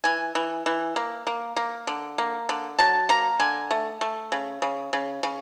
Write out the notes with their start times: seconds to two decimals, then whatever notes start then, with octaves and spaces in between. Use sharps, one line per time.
0.04 E3 G#5
0.35 E3
0.66 E3
0.96 A#3
1.27 A#3
1.56 A#3
1.87 D3
2.18 A#3
2.49 D3
2.79 F#3 A5
3.09 A#3 A#5
3.40 D3 G#5
3.71 A3
4.01 A3
4.32 C#3
4.62 C#3
4.93 C#3
5.23 C#3